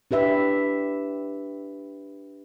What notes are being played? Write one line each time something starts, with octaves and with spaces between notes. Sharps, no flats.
D4 G4 B4 E5